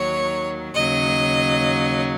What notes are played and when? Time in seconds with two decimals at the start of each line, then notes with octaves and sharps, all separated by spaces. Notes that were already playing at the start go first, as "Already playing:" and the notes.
Already playing: D#2 D#3 F#3 C#5
0.75 D#2 C#3 F#3 D#5